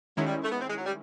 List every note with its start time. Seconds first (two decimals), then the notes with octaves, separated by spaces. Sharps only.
0.17 D#3 F#3 G#3 C#4 E4
0.27 G3
0.43 A3
0.51 B3
0.61 C4
0.69 G#3
0.77 F#3
0.86 G3